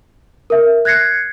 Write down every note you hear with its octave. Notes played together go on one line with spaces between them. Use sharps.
A#4 E5
F#6 G#6 A#6 C7 C#7